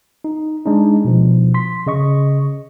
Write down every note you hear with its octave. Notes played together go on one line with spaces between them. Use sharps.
D#4
G#3 D4 D#4
B2 F3
C6 B6
C#3 D#5 C#6